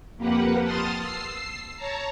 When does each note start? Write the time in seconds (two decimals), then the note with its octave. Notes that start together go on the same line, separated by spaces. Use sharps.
0.17 F2 A#3 G4 B4 F#5
0.63 A5 C6 D#6 F6 A6
0.98 E6 C7
1.77 C#5 A5 A#5